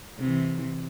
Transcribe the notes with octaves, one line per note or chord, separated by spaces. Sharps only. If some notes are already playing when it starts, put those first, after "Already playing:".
C3 E3